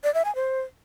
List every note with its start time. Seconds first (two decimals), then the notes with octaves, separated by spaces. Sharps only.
0.04 D5
0.14 E5
0.25 G#5
0.35 C5